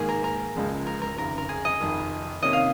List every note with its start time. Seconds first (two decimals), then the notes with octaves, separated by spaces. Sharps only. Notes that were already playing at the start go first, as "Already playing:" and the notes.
Already playing: G#2 D#3 A#3 G#4
0.09 A#4
0.24 A#4
0.55 C#2 C#3 F3 G#3
0.87 A#4
1.02 A#4
1.17 F1 D#2 C#3 A#4
1.38 A#4
1.49 G#4
1.65 D#5
1.80 F1 F2 D#3
2.42 C3 D#3 A#3 C#4 D#5
2.53 F5